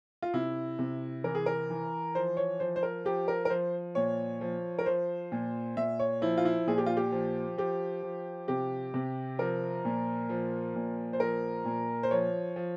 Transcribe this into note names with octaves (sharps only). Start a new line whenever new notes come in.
F4
C3 E4
C3
E3 A#4
G#4
A#4
E3
F3 C5
C#5
F3 C5
C5
A#4
F3 G4
A#4
A#4
F3 C5
A#2 C#5
F3
A#4
F3 C5
A#2
A#2 E5
C#5
F3 E4
F4
E4
A#2 G#4
G4
F4
G4
F3
F3 G4
F3
C3 G4
C3
F3 A#4
A#2
F3
A#2
C5
F3 A#4
A#2
C5
F3 C#5
F3